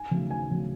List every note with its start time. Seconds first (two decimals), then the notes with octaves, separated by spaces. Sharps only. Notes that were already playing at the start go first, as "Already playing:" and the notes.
Already playing: G#5
0.11 C#3 F#3 A3
0.30 D#2 G#5
0.50 C#3 F#3 A3